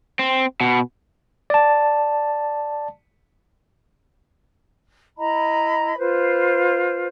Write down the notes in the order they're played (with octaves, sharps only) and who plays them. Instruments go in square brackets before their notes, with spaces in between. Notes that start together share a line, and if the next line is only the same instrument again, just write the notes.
[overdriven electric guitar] C4
B2
[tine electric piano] D5 A5
[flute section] E4 D#5 A#5 B5
F4 B4 C5